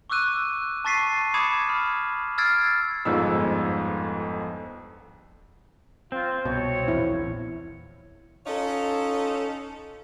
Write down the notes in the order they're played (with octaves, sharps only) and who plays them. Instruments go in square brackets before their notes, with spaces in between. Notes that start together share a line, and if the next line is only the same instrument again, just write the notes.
[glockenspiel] C#6 D6 E6 F#6 D#7
A5 C#6 A6 B6 C7 D#7
B5 D6 D#6 G#6 C#7 E7
B5 F6
E6 F6 G#6 A6 C7 D7
[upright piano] G1 F2 G#2 E6
[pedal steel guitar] C4 [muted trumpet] F4
[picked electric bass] C2 B2 [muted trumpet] C#5
[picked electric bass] A#1 E2 [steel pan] E4
[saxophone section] C#4 D#4 F4 A4 C#5